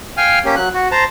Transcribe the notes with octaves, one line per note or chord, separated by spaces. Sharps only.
F5 G5 G#5 F6
A#3 C#4 G4
F#3 F#6
F#4
C5 A5 A#5